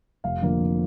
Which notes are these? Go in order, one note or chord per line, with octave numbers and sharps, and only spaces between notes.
F1 F5
F2 D3 F3 A#3
F1